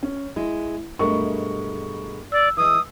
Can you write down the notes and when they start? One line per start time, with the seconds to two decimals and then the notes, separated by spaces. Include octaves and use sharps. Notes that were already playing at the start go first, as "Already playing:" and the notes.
0.03 C#4
0.36 G#3 E4
0.99 G2 B2 G#3 A3 A#4 C#6
2.32 D5 E6
2.57 E3 G#3 D#6